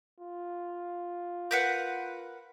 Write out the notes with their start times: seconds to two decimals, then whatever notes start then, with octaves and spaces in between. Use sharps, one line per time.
0.20 F4
1.51 A#4 B4 F#5 G6 B6 C#7